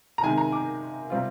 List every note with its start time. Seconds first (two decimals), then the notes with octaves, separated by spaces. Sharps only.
0.18 A#5
0.23 C3 D#3 G#3 G#5
0.38 A#5
0.52 D6
1.10 C3 G3 C4 F4